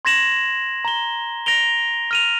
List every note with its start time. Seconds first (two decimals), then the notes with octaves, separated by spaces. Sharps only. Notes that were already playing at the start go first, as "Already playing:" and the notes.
0.05 C6 G#6 A#6 E7 F#7
0.85 A#5 G7
1.46 A#6 D7 F7 G7
2.11 F6 D#7 F7